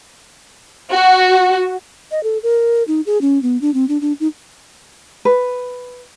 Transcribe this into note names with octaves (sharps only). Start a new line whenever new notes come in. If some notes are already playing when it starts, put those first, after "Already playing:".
F#4
D#5
A4
A#4
D#4
G#4
C#4
B3
D4
C4
D4
D4
D#4
B4